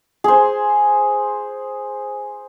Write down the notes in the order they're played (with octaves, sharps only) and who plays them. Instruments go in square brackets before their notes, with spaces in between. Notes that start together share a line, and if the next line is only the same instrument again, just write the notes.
[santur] G#4 C5